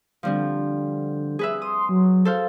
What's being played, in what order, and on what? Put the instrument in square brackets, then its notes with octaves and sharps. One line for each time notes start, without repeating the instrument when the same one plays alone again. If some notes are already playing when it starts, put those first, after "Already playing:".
[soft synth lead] D3 [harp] F3 G3 C4
[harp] G#4 B4 E5
[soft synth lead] C6 [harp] D#6
[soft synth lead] F#3
[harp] A4 C5 F5